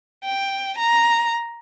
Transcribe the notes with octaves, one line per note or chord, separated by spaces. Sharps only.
G5
A#5